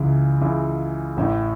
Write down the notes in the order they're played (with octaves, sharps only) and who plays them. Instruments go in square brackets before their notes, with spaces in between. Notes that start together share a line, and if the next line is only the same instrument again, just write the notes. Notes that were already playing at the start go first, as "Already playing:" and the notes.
Already playing: [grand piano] C#2 C#3 E3
C#2 C#3 E3
A1 A2 E3 E5